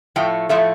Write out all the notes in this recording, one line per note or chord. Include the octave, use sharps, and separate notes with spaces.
A2 F3 A3 G5
A2 F3 A3 E5